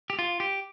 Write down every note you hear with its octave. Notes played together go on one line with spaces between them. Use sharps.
G4
F4
G4